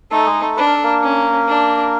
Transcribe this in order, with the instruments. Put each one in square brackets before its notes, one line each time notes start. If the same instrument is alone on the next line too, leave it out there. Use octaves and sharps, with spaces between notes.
[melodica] A3 A4 [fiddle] D#4
[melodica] G#3 G#4
A3 A4
[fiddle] D4 [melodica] B4
[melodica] A#4
A4
A#3 A#4
[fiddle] C#4
D4